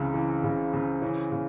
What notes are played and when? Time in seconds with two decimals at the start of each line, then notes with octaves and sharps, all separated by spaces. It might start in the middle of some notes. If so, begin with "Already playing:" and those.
Already playing: C#2 C#3 E3 C4
0.14 E3
0.44 C#3
0.73 C#3
1.02 E3 C#4
1.32 C#3